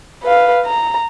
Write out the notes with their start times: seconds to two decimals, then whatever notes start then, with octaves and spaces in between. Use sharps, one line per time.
0.24 B4 F5
0.65 A#5